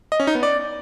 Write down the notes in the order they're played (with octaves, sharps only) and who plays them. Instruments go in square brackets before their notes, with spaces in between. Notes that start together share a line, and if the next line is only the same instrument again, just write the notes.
[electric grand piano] D#5
C#4
D#4
B3
D5